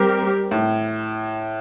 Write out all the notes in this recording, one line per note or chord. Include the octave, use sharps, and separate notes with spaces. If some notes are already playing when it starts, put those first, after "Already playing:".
Already playing: G3 C4 G4 A#4
A2